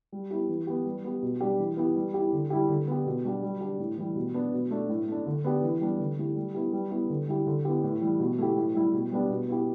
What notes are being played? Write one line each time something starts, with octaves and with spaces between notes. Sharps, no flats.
G3
B3 E4 G4
E3
B3 G4
G3
B3 G4
B2
G3 D4 G4
E3
B3 E4 G4
G3
E4 G4
D3
G3 E4 G4
D3
B3 G4
B2
G3 D4 G4
G3
D4 G4
A2
E3 G3
B2
B3 D4
B2
A3 D4
A2
A3 D4
D3
B3 D4 G4
E3
G3 B3 D4
D3
A3 E4 G4
G3
B3 E4 G4
G3
B3 E4 G4
D3
G3 E4 G4
D3
B3 E4 G4
A2
E3 G3
B2
A3 E4 G4
A2
G3 E4 G4
B2
G3 B3 D4 G4
B2
B3 E4 G4